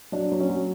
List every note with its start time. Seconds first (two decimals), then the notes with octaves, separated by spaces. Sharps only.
0.12 F#3 D4
0.32 F#3
0.40 C#4
0.50 F#3